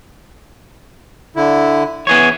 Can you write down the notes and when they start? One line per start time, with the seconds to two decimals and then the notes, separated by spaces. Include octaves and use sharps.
1.36 D3 E4
2.07 E3 B3 G#4 C#5